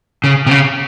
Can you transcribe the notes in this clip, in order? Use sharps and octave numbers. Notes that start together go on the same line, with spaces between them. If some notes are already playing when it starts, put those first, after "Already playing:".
C#3
C3
C#3